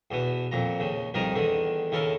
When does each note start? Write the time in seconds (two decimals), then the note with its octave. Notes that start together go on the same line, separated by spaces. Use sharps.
0.11 E2 B2 B3
0.52 F2 A#2 A#5
0.80 D#2 C#3
1.14 C2 F2 D#3 A#4 A#5 D#6
1.35 E2 D3 D#3
1.92 D#2 C#3 E4 A4 A#4